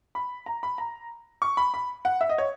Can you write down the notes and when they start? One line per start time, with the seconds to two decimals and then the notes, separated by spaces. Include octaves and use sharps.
0.15 B5
0.46 A#5
0.63 B5
0.78 A#5
1.42 C#6
1.57 B5
1.74 B5
2.05 F#5
2.21 E5
2.29 D#5
2.38 C#5